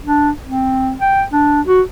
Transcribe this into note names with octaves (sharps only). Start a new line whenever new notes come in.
D4
C4
G5
D4
F#4